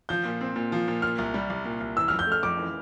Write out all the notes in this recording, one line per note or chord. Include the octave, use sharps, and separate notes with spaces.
F3 G6
A#2
C4
A#2
F3
A#2
A#2 F6
C2
G3
C2
A#2
C2
E3 E6
F6
F2
G6
A3 F6
F2 D6
E3